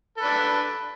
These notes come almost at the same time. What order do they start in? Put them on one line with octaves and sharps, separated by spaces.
A4 B4 D4